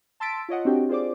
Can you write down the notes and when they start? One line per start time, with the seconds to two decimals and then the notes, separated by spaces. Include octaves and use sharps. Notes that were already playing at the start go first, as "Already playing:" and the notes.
0.20 A5 C6 E6 A6 B6 D7
0.49 F4 C#5 D#5 F#5
0.65 C4 D4 F#4 G4 C#5 G5
0.89 F4 G#4 C5 D5 D6